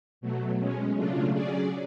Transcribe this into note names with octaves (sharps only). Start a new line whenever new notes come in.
B2 F#3 A3
B2 G#3 C#4
C#3 F#3 A3 D4 F4
F#3 C#4 G#4 D5